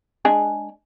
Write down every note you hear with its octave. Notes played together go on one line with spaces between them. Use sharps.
G#3 D4 G#4